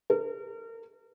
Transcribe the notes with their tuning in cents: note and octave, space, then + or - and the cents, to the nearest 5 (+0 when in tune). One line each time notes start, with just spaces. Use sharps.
A#4 -35